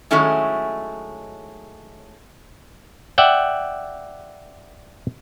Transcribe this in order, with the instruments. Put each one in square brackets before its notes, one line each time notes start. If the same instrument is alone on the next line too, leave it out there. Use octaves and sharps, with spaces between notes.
[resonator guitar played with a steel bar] D#3 F#3 G#3 A3 C#4 E4
[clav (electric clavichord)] D5 E5 F#5 G5